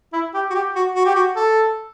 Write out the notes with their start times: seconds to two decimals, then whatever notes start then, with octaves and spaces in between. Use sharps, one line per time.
0.13 E4
0.34 G4
0.50 F#4
0.55 G4
0.76 F#4
0.95 F#4
1.05 G4
1.15 F#4
1.36 A4